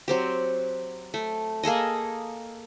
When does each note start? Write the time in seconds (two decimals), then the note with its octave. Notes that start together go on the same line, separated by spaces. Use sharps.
0.08 F#3 C4 G4
1.14 A3
1.63 A#3 G#4 A4 D#5